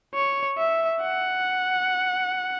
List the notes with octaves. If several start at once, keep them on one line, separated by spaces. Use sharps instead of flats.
C#5
E5
F#5